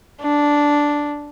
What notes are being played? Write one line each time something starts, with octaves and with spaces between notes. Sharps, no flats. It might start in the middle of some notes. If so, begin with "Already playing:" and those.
D4